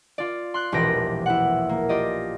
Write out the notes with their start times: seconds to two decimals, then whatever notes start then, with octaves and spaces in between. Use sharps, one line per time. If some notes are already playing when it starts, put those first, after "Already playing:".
0.18 F4 D5
0.54 C6 F#6
0.72 E1 A#1 G4 B4 A#6 D7
1.26 E4 F#5
1.69 A#3
1.89 F4 G4 D5 D#5